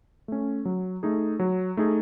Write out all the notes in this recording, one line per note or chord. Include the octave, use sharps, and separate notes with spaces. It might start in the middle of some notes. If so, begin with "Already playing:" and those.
A3 C#4
F#3
A3 D#4 G#4
F#3
A3 D#4 G#4